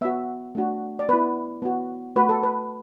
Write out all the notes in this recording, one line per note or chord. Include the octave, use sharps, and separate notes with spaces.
B3 F#4 E5
A3 D4 F#4
D5
B3 E4 B4
B3 F#4
A3 F#4 B4
A4
B4